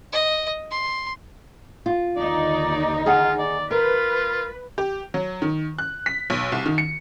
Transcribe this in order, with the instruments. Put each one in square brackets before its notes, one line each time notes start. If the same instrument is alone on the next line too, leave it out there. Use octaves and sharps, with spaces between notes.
[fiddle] D#5
C6
[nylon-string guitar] F4
[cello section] D#2 D3 D#4 [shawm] D5
[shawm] F4 [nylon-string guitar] G#4 F#5 G#5
[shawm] D5
[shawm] F4 [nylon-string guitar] A#4 [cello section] B4
[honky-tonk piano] G4
F#3
D#3
F#6
B6
B1
C2
D#3
C#7